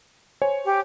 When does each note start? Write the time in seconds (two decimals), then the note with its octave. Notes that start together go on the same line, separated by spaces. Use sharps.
0.42 C5 C#5 G#5
0.65 G4